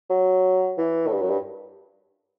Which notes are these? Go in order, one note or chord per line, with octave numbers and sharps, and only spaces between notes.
F#3
E3
A2
G2
F#2
G2